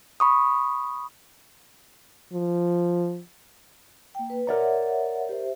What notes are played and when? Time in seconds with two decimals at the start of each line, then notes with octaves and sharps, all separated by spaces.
0.20 B5 C#6 D#6
2.33 F3
4.15 A#3 G5
4.30 B4
4.47 A#4 C#5 D5 E5 F#5 A#5
5.29 G4 C5 E5